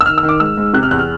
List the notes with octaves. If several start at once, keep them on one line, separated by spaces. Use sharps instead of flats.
E6
D#3 F6
E6
D#3
D6
G#2 E6
G#2
C3 F#6
F6
E2 F#6
F6